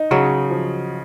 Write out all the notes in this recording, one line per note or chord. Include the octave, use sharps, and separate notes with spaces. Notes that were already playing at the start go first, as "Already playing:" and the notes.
Already playing: D#4
C#3 F#3
F3